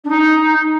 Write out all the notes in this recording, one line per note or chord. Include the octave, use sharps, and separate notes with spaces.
D4
D#4